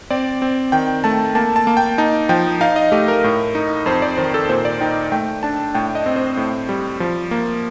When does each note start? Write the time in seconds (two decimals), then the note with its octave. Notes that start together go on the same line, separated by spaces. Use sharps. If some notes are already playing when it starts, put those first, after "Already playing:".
0.10 C4 D5
0.42 C4
0.72 D#3 G5
1.04 A3 A5
1.35 A#3 A5
1.56 A5
1.67 A#3
1.77 G5
1.98 D#4 A5
2.29 F3 G5
2.61 D#4 F5
2.76 D#5
2.92 A3 G4
3.08 A#4
3.24 A2
3.55 D#4
3.86 F2 C5
4.02 D5
4.17 D#3 C5
4.34 A4
4.49 A#2 C5
4.65 D5
4.81 D#4 G5
5.12 A3 G5
5.43 D4 A5
5.75 A2 G5
5.95 D#5
6.06 C4
6.16 C5
6.37 A2
6.69 G3
7.00 F3
7.31 A#3